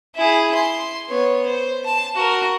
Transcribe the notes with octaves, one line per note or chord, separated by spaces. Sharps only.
E4 G#4
C6
B3 C#5
C5
A5
F#4 A#4